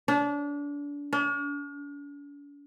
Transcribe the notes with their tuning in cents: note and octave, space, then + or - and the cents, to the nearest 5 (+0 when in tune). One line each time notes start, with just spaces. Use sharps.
D4 -30
D4 -45